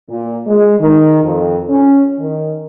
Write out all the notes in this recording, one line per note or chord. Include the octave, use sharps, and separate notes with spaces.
A#2
G#3
D#3
F2
C#4
D#3